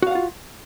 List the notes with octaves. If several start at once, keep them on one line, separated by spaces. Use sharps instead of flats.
F4 F#4 F5 F#5